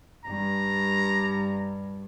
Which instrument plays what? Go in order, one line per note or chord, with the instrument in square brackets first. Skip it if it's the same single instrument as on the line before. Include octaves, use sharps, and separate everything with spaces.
[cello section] G2 [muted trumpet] A#5